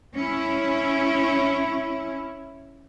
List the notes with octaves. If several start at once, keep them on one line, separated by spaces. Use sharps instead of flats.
C#4 E4